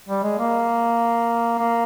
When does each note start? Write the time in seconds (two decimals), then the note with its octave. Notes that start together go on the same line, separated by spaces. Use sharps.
0.09 G3
0.23 G#3
0.39 A#3
1.59 A#3